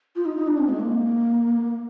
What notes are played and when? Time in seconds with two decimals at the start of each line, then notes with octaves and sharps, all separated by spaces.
0.16 F4
0.25 D#4
0.37 D#4
0.47 D4
0.58 C4
0.69 G#3
0.79 A#3